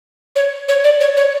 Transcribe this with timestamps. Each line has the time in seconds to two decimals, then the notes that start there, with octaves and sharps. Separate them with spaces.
0.36 C#5
0.68 C#5
0.84 D5
1.01 C#5
1.17 C#5